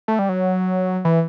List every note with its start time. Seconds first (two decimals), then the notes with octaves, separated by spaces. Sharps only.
0.08 A3
0.19 G3
0.29 F#3
1.05 E3